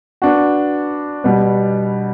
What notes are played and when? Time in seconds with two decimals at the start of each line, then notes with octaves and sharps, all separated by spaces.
0.22 B3 D4 F#4
1.24 B2 G3 B3